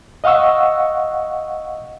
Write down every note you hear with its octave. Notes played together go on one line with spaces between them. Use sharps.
D#5 F5 F#5 C#6 E6